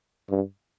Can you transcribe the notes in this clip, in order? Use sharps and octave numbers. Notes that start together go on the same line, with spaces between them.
G2